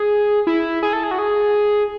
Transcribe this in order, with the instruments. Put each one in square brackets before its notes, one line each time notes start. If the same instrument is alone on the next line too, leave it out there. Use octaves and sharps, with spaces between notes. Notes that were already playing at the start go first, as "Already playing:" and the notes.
Already playing: [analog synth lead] G#4
E4
G#4
A4
G#4
F#4
G#4